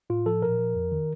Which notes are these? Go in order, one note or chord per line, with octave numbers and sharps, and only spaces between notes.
A2 F4
F3 A4
A#2 A#4
F3
F2
D#3